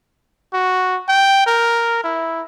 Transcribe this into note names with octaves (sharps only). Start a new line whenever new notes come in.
F#4
G5
A#4
E4